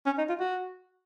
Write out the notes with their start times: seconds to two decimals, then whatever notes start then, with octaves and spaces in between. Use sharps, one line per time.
0.06 C#4
0.18 D#4
0.29 F4
0.40 F#4